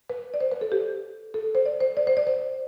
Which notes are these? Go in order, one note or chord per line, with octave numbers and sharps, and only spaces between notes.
B4
D5
C5
B4
A4
G4
A4
C5
D5
C5
D5
C5
D5
C5